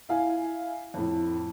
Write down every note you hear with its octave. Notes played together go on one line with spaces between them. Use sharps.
E4 F5 G#5
F2 A2